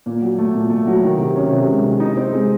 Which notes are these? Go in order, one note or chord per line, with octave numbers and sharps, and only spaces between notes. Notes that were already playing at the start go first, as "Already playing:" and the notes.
A#2
F#3
A3
A#2
A3
F#3
D#3
C3
C#4
C3
G#3
C3
D#4
C4
G#3